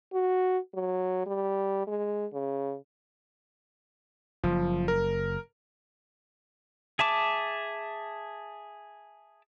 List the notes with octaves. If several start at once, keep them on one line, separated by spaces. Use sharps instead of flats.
F#4
F#3
G3
G#3
C#3
F#1 F3
A#4
G#4 E5 A5 D6